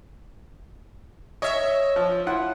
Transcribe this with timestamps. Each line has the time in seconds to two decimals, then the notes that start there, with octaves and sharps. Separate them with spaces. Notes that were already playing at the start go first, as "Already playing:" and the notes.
1.42 C#5 D#5 E5
1.96 F3
2.26 E4 F4 F#5